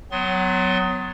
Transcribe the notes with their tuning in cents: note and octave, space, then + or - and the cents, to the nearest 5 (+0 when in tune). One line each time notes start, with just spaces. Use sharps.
F#3 +0 B3 +30 C6 +20